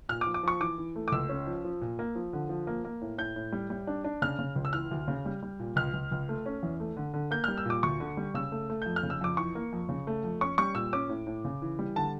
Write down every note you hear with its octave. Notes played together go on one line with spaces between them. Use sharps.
A#2 F6
D6
F3
D6
F3 C#6
E3 D6
E3
A3
D6
C#2 E6
C#4
F3
F3
A#2
A#3
F3
D3
F3
A#3
A#3
A2
A2 G6
A2
G3
G3
D4
D4
C#3 F6
C#3
C#2
E6
E3 F6
D2
C#3
G3
G3
A#2
C#2 F6
C#2
C#2
A3
C#4
E2
A3
D3
D3
A#3 G6
G3 F6
E6
A#2 D6
D2 C#6
D3
G3
C#3 E6
A3
A3
F2 G6
F6
C#3
E6
F2 D6
E3 C#6
A#3
F2
C#3
A3
F2
C#4 C#6
G3 C#6
A#2 E6
C#4 D6
A2
A2
C#3
E3
G3
D3 A5